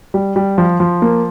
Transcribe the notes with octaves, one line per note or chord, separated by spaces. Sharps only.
G3
G3
F3
F3
A#3